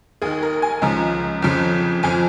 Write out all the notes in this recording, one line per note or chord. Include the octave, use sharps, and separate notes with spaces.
D#2 D#3 G#4
A#4
G#5
C#2 C#3 F3 A#5
F2 C#3 F3
F2 F3 G#5